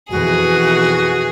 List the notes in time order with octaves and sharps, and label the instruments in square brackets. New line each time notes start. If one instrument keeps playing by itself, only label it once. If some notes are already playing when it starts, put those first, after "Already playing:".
[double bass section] F2 B2 E3 [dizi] F#4 [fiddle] G#4